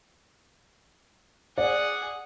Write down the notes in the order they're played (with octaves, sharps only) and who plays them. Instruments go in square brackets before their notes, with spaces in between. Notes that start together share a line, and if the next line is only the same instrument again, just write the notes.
[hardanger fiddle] G#4 F#5 [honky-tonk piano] D5